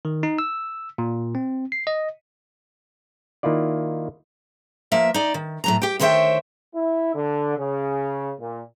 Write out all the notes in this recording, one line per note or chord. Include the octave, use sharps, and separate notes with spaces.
D#3
D#4
E6
A#2
C4
C7
D#5
D#3 A#3 E4 F4 D5
F3 A#3 E5
D#4 D5
D#3
A2 F#3 A#5
G4 G5
D2 D#3 C5 C#5 E5 G5
E4
D3
C#3
A#2